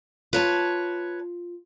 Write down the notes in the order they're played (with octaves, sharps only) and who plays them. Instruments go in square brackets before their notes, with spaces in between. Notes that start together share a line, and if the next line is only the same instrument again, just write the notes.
[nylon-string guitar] F4 [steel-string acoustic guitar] B4 C#5 A5